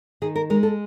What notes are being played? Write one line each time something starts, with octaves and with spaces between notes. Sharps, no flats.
D#3 G#4
A#4
G#3 A#4
A4